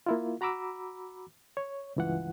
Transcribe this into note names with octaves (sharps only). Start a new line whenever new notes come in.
A#3 E4 F4
F#4 A#5 B5 D6 E6
C#5
C#2 G2 E3 F4 F#5